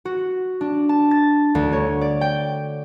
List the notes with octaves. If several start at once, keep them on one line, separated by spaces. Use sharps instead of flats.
F#4
D4
A5
A6
D2
C#5
D5
G5